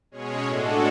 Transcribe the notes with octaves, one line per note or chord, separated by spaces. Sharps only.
B2 G#3 C#4 G#4 C#5
A2 G#3 D4 F#4 A4